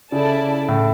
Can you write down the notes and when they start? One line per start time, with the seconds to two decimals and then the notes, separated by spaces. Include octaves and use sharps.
0.12 C#3 E4 A4 D5 A5
0.69 A2